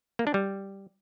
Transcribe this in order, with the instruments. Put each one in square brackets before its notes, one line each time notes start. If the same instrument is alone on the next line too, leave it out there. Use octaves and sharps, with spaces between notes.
[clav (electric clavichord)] A#3
D4
G3